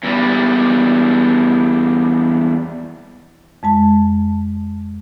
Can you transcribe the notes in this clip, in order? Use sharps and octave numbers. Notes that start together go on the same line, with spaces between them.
E2 G3
F2 G#3 A5